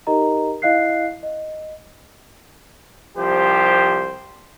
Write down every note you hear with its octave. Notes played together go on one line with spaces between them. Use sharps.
D#4 G4 A#4 D#5 A#5
E4 D#5 F5 F#6 C7
D#5
C2 F3 G4 C5